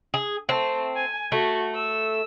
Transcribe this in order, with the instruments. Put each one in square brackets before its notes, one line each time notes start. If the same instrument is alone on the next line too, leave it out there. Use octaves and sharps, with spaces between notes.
[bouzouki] G#4
[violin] A3 [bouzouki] C4
[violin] G#5
[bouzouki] A3 [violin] F#4
[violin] E6